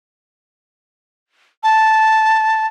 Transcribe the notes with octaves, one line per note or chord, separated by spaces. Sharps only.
A5